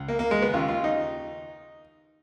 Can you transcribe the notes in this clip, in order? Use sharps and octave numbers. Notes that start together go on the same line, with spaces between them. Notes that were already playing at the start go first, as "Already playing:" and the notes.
Already playing: C#2
A#3
A#3
G#3
B3
D#2 C#3 F4
F4
D#4